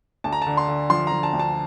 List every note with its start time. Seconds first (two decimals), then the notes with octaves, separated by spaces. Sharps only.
0.24 D2 A5
0.33 A#5
0.42 D3 A5
0.57 C6
0.68 D3
0.90 F3 C6
1.07 F3 A#5
1.23 A5
1.33 D2
1.39 A5